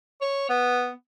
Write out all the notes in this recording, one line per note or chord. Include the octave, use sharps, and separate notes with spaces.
C#5
B3